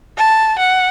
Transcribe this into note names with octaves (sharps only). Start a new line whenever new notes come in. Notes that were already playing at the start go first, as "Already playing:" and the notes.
A5
F#5